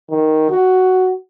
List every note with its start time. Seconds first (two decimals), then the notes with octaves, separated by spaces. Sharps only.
0.10 D#3
0.50 F#4